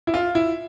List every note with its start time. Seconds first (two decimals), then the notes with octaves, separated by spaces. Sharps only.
0.07 E4
0.14 F4
0.35 E4